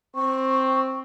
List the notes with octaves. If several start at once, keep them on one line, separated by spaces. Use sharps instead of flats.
C4 C#6